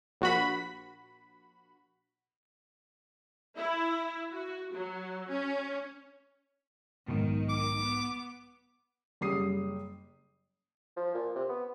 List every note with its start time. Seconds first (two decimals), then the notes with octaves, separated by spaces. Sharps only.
0.21 A#1 F#4 B5
3.57 E4
4.32 F#4
4.73 F#3
5.30 C#4
7.08 B1 G#2 B2 D#3
7.49 D6
7.80 B3
9.21 F#1 G3 D#6 C7
10.96 F3
11.14 A#2
11.35 C3
11.49 B3